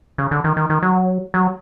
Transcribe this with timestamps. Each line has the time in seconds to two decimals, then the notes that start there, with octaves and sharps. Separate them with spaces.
0.18 C#3
0.31 D3
0.44 D#3
0.57 D#3
0.70 D#3
0.83 F#3
1.34 F#3